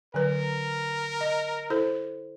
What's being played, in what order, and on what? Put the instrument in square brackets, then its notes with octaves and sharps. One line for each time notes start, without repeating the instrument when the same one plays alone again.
[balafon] D3 F#3 B4 [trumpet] A#4
[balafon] D#5
E4 A4 C5